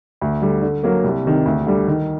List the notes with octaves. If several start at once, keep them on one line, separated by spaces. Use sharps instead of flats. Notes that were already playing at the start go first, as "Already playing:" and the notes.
D2
D3 G3
D3
F#3 A#3
C2
C3 D#3
D2
D3 G3
D#3